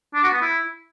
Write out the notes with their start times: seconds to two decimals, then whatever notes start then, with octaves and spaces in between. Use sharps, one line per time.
0.14 D4
0.23 F#4
0.32 B3
0.42 E4